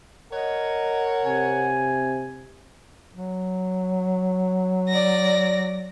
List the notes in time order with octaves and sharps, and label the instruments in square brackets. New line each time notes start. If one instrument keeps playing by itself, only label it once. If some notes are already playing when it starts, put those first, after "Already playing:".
[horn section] A#4 C#5 F#5 [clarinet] D#5
[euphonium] C3 [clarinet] G#5
[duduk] F#3
[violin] D5 A#6